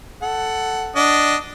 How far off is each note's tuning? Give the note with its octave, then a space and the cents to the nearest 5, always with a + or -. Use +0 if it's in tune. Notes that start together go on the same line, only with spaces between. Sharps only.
A4 +0 F#5 +15
D4 +0 D#5 +0 F#5 +15